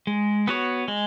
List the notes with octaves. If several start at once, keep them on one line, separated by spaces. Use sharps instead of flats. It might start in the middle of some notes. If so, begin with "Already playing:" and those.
G#3
B3 F#4 C#5
G#3